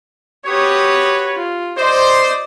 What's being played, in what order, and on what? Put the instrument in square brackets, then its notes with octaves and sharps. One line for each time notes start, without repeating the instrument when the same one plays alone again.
[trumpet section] F#4 B4 C#5 [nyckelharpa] G4 D#6
[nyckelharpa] F4
[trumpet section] C5 [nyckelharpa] D5 D#5